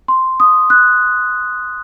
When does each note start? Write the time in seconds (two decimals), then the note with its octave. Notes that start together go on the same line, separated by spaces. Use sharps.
0.08 C6
0.40 D#6
0.70 F#6